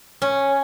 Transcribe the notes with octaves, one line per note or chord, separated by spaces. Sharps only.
C#4